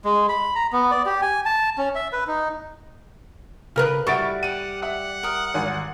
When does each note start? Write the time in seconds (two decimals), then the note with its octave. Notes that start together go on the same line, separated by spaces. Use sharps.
0.05 G#3
0.29 B5
0.56 A#5
0.73 B3
0.91 D5
1.06 G4
1.22 G#5
1.46 A5
1.78 C#4
1.95 E5
2.13 B4
2.27 D#4
3.76 C#3 A#4 B4 F6 F#6
4.07 G3 E4 F#4 B5 C#6 A6 D7
4.43 G4 D5 F#5 D#7
4.83 E5 F#5
5.23 A#4 D#6
5.54 G#1 G#5